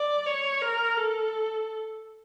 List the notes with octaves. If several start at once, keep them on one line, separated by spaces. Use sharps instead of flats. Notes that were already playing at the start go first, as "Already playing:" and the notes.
Already playing: D5
C#5
A#4
A4